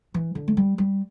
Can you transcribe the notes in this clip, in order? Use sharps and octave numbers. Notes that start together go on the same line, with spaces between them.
E3
D3
A3
G3
G3